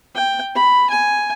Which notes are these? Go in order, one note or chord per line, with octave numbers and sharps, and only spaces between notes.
G5
B5
G#5